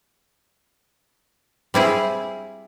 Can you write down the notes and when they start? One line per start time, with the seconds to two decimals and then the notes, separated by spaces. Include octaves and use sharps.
1.74 G3 C4 E4 G#4